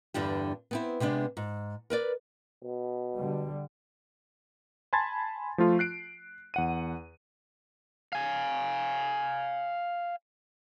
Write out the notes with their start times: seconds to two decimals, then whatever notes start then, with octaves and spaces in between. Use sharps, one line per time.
0.14 E2 G2 D3 D4 G4
0.71 B3 C4 E4
1.00 C3 G#3 B3 D4
1.37 G#2
1.90 A#4 B4 D5
2.64 B2
3.16 D3 G3
4.93 G#5 A5 B5 C6 G#6 A6
5.58 F3 A3 F4
5.79 F#6 C7 D7
6.54 E2 F#5 D#7
8.13 F5 G#5